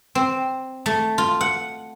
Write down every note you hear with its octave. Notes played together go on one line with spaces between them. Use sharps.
C4
A3
F4
F#5